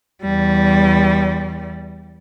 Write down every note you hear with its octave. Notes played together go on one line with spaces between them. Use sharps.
E2 G3